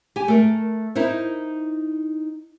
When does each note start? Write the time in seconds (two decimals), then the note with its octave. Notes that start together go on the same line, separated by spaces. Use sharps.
0.16 G4 G#5
0.28 A3 A#4
0.95 D#4 E4 A#4 C5